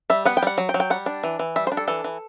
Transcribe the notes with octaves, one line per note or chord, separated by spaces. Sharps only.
G3 E5
B3 F#5
G5
G3 F#5
F#3
G5
F#3
G5
G3 F#5
D4
E3
E3
G3 E5
C5
D4
A4
E3 A4
E3